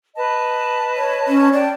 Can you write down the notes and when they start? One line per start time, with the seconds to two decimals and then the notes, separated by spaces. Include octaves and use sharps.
0.15 B4 D#5 A5
0.97 C#5
1.28 C#4
1.53 D5 G5 A5